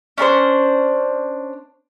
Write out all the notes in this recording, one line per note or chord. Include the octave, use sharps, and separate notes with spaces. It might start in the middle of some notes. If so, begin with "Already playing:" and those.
C#4 D4 A#4 C5